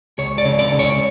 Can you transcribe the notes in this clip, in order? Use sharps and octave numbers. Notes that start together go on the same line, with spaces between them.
C#2 C#5
D5
C#3
D5
C#2
C#5